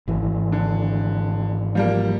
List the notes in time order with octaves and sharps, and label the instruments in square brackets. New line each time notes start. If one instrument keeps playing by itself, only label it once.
[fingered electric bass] G#1 E3
[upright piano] D3
F3 G3 A#3